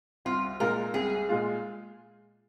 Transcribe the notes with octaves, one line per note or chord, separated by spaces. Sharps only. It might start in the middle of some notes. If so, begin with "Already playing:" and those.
C2 F4
A#2 G#3 F4 A#4
C2 G#4
A#2 G#3 F4